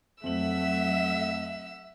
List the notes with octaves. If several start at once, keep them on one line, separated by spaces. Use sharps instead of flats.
F2 F#3 A3 E5 F#5 E6 F#7